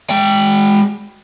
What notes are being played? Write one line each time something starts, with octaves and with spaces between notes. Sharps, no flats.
G#3 G5